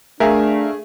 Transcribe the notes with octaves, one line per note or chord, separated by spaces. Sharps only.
A3 D4 G#4 A#4 E5 F5